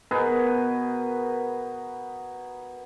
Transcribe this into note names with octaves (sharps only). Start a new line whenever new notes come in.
B2 G#4 A#4 B4